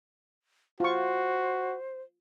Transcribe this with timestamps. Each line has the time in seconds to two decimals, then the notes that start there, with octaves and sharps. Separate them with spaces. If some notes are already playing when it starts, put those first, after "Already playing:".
0.80 F4 F#4 C5 C#6